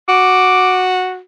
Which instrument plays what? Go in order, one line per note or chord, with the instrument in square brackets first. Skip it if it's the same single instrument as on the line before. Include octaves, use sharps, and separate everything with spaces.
[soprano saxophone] F#4 [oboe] D6